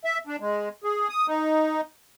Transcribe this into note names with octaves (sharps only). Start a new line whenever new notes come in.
E5
D4
G#3
G#4
D#6
D#4